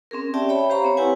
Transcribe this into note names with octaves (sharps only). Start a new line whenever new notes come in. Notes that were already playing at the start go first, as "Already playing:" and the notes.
C4 C#4 G#4 A#4
C#4 G4 D5 E5 G5 A5
C#5 E5 G5 B5
G4 C5 F5 A#5 B5 C#6
C4 C#5
E4 G4 B4 F#5 G#5